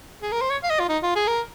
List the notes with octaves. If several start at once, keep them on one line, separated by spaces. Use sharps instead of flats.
G#4
A#4
C5
C#5
F5
D#5
F4
D#4
F4
G#4
A#4